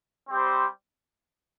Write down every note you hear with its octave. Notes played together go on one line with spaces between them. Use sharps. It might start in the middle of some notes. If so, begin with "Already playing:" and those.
G3 C4 G4 C5